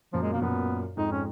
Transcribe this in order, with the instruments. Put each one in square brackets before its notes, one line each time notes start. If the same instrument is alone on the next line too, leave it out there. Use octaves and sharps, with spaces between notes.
[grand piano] F#2 A#2 [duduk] F3
[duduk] G#3
[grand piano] B2 [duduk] A#3
[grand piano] F#2 A#2 [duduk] B3
[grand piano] F2 G#2 [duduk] D#4
[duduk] C#4